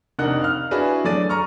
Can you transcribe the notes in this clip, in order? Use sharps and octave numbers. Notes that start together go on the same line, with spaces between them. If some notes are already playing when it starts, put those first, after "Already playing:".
F1 D4 D#4 A#4 F#5 F#6
F5 F6
D4 E4 F#4 G#4 B4 E5
F#3 A3 D4 D5 A6 D#7
A#5 C#6 F6